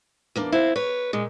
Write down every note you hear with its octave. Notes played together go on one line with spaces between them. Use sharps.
E2 A#3 D4
C4 E4 F5
B4 C#5
A#2 G#3